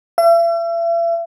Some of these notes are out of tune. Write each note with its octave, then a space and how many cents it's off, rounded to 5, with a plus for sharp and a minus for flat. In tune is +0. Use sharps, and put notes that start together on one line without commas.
E5 +40